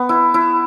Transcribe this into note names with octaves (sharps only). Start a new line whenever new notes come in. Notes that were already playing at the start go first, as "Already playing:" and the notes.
Already playing: B3
E4
E4